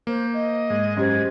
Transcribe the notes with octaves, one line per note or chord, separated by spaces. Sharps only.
A#3 C5
D#5
G#2 G#3
F#2 C#4 G4 C5 G#6